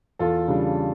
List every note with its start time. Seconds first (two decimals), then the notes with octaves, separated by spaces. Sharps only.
0.19 E2 F4 A4
0.48 C#3 G3 D4